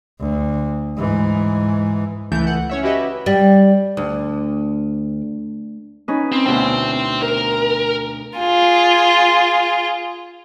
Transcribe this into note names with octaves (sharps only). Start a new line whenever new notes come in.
D2
G#2 E3
C#2 E3 A3 G6
F#5
C#4 C#5 E5
E4 F#4 G4 B4 D#5 E5
G3
D2
C#4 D#4 B4
C4
D2 B2 E4 C5 G5
A#4
F4 G#4